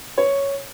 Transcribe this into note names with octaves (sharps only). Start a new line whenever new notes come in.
C#5